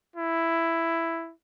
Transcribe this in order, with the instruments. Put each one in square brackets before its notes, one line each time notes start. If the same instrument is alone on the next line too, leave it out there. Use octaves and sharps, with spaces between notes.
[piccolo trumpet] E4